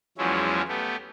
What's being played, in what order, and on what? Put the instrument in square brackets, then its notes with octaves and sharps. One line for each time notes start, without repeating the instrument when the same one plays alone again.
[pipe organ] E2 F3 F#3 G#3 C#4 E4
A3 B3 G4